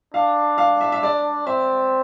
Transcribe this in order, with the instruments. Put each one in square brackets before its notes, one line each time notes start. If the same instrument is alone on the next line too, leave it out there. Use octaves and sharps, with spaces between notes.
[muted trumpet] D4 [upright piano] F5
[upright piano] F5
E5
E5
D5
[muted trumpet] C4 [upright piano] E5